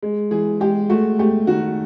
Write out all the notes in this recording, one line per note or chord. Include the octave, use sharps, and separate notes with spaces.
G#3
E3 G#4
G#3 G4
A3 F#4
A3 G4
D#3 F#4